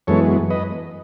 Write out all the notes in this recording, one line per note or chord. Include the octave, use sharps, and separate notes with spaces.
F#2 E3 G#3 B3 A4 C#5
B4 D#5